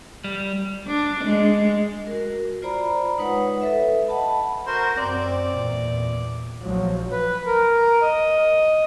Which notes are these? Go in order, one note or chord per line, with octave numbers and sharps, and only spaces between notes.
G3
D4
G#3
F#4 A#4
F4 C5 D5 A#5 B5
G#3 D#4 B4 C#5 F#5
A4 B4 E5
D#5 F#5 A5 B5
F#4 A#4 C5
F#2 C4 D5
E2 A#2
A#1 F3 F#3
B4
A#4
D#5